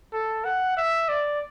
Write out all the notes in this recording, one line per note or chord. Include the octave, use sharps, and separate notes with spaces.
A4
F#5
E5
D5